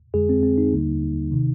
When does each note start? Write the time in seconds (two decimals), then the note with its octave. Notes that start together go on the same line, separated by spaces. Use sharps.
0.14 F2 D3 G#3 G#4
0.29 C4
0.43 C4
0.58 D#4
0.73 D#2 D3 G3 A#3
1.32 C3 D#3